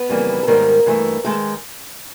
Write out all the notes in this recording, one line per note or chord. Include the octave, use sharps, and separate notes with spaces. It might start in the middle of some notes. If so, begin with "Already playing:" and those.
Already playing: B3 B4
F2 C#3 E3 G3 A#3
A4
G#2 D#3 G3 A#3 A#4
G2 E3 A3
D#3 G#3 A3 A4